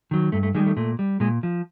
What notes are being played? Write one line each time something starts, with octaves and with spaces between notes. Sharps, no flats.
D#3 F#3
G2 A3
A3
D#3 G3 G#3
A3
A#2 A3
G3
A#2 G#3
F3